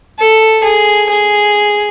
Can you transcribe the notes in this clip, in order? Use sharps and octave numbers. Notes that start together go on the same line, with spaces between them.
A4
G#4
G#4